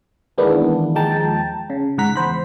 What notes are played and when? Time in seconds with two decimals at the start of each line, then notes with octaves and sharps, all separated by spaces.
0.38 D#3 E3 G#3 A#3 B3 D4
0.95 D#2 F3 G#3 G5 A5 A#5
1.70 C#3
1.98 C#2 G#2 F#5 A#5 B6
2.16 E2 C5 B5